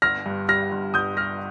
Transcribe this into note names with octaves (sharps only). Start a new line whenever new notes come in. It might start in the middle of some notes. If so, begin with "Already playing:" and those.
G1 F6 A#6
G2
G3 F6 A#6
G1
G1 D#6 G6
G3 F6 A#6